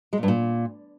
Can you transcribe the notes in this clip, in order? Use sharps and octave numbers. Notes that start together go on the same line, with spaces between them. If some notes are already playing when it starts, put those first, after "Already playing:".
G#3
A#2
G2
A#2